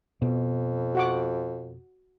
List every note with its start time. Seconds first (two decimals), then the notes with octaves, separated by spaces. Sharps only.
0.22 F2 B2
0.95 F#4 F#5 D6